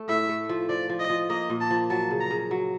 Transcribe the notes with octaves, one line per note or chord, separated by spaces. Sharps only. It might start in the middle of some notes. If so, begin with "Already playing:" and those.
Already playing: A3
A2 E5
A3
F3
F3 D5
F3
D#5
F3
A#3 D#5
A#2
A5
F3
F#3 A5
C#3
A#5
C#3
F#3